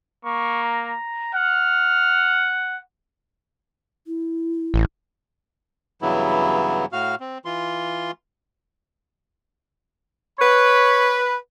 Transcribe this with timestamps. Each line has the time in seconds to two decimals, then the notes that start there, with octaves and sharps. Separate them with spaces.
0.25 A#3 C#6
0.63 A#5
1.34 F#5 F6
4.07 E4
4.74 A1
6.02 G2 C#3 E3 F#3 B3 E4
6.92 A2 F#4 F5 F6
7.20 C4
7.45 E3 F4 C6
10.39 B4 C#5 B5